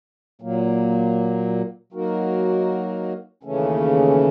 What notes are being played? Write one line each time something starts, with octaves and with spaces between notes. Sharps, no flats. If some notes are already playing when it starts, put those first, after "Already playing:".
A#2 F#3 A#3
F#3 A#3 D#4 F#4 A#4
D#2 C#3 E3 A3 C#4